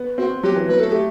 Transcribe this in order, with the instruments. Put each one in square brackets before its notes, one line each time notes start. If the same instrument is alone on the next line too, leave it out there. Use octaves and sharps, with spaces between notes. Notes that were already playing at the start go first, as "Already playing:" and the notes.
Already playing: [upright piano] B3
[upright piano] C4 [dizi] F#4
[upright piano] F#3 [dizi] G4
[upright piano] E3
[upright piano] F#3 [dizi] B4
[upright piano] A3 [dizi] A4
[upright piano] A3 [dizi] G4